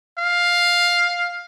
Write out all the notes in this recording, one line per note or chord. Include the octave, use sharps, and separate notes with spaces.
F5